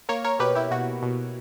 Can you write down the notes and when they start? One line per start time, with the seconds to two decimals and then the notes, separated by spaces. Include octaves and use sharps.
0.09 A#3 A#4 C#5
0.24 A#4 C#5
0.39 B2 G4 B4
0.55 E4 G4
0.71 B2 F#4
1.02 B2